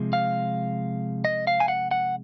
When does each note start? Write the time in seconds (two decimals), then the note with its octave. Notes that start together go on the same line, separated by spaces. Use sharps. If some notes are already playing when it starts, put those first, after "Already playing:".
Already playing: C3 F3 G#3
0.13 F5
1.25 D#5
1.47 F5
1.60 G#5
1.68 F#5
1.91 F#5